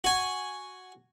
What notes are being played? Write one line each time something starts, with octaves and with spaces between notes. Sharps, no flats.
F#4 G#5